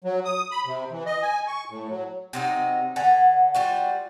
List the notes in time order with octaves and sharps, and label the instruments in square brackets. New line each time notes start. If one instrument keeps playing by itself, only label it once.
[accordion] F#3
D#6
B5
C3
E3
D#5
G#5
C#6
A2
F#3
[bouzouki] C3 F#3 D#4
D3 F#5 G#5 A#5
G3 F4 F#4